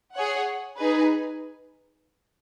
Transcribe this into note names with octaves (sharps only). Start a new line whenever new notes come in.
G#4 C#5 F#5
D#4 G#4 B4